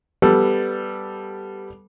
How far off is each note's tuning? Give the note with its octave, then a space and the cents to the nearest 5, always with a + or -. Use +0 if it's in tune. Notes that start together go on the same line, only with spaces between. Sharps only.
G3 +0 B3 +5 A4 +0